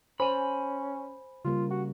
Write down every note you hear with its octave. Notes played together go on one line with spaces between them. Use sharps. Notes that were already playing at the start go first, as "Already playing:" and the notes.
C#4 C5 G#5 B5
C#3 G3 A#3 F4
F#4